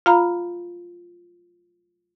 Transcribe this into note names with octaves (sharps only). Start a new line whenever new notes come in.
F4 F5 A#5 B5